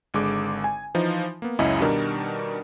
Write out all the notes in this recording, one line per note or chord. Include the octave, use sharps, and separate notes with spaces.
G#1 D3 G#3 D6
G#5
E3 F3 D#4
A#3 B3
C#2 F#2 C#4 E4 D#5
B2 D#3 G3 D4 D#4 A#4